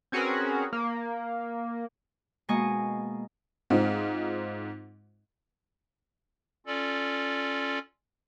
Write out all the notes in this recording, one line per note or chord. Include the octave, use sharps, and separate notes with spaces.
C4 C#4 F#4 G#4 A#4 B4
A#3
B2 G#3 A#3 D#5 G#5 C#6
G#2 C4 D#4 F4
C#4 F4 A4 D5